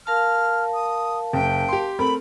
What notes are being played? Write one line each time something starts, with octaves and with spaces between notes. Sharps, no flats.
A#4 F5 A5 F6
D#6
F#1 G5
G4 C6
A3 C4 A#4 B5